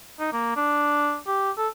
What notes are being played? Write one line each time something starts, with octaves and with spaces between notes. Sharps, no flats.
D#4
A#3
D4
G4
A4